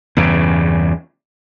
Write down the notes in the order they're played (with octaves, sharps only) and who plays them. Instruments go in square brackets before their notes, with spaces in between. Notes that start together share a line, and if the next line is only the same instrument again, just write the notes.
[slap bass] E2 G2 C#3